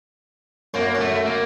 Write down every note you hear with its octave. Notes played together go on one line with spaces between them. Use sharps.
F#2 A#3
F#2
A3
A#3